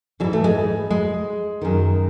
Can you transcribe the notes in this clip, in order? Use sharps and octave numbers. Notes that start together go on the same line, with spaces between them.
G#2 E3 F#3
A3
G#3
G#3
F#2 D#3